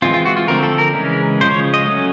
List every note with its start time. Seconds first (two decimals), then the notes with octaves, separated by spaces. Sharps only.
0.02 E3 G#3 C4 F4
0.14 F4
0.26 F#4
0.37 F4
0.48 D3 F3 A3 C4 A#4
0.63 A4
0.78 A#4
0.94 C#3 E3 G#3 C#4
1.40 C#3 F3 G#3 C5
1.51 C#5
1.74 D#5
1.85 F#3 A3 C#4